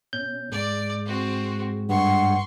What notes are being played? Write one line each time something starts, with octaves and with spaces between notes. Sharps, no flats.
B2 C#4 G6
G#2 G#3 D5
C4 F#4
G2 F#5 C6 C#6